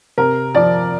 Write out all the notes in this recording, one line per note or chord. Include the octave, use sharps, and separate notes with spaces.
C3 A#4
F3 D5